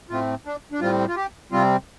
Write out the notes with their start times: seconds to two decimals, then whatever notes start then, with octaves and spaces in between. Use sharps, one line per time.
0.10 A2 A3 C4 F4
0.46 D4
0.72 D4
0.80 A2 G3 C4 F4
1.08 F4
1.16 G4
1.52 C3 G3 C4 F4